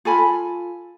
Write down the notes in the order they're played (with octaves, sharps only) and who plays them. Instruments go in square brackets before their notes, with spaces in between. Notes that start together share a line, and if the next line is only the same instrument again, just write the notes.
[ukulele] F4 A4 G#5 B5